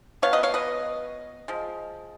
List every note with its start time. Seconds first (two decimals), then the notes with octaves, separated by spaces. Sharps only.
0.22 F3 B3 C#5 F5
0.33 B4 D#5
0.43 C#5 F5
0.54 B4 D#5
1.48 F3 G#3